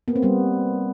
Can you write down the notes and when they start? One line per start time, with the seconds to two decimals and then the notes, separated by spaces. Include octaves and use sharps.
0.08 A#3 B3
0.16 C4
0.22 G3 B3